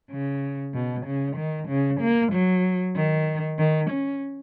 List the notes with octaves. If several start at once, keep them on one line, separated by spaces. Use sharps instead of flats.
C#3
B2
C#3
D#3
C#3
A#3
F#3
D#3
D#3
C#4